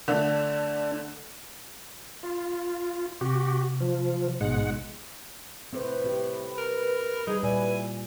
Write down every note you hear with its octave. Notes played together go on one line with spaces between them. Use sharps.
D3 A3 D4
F4
C3 F#4 G4
F3
A1 G#2 B2 G#3 F#5
A2 C4 B4 C5
C4 G4
A#4
G3 D#4 G#4
A#2 G3 E4 D5 G#5